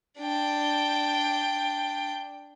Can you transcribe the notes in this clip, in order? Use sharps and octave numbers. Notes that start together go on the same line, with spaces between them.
D4 G5